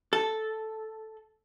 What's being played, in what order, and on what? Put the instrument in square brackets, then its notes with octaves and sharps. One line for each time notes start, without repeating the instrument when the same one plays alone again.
[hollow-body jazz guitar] A4